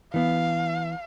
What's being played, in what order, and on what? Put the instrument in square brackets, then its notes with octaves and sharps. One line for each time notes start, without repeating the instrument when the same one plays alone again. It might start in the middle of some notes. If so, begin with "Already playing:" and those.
[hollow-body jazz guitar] E3 B3 [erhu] F5